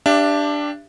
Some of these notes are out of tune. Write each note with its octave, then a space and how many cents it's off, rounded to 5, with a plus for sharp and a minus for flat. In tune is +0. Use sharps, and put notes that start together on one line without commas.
D4 +0 G4 +10 E5 +40